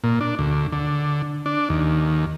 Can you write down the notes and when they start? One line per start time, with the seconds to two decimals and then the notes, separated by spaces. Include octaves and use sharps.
0.04 A#2
0.21 D4
0.39 D2
0.72 D3
1.46 D4
1.70 D#2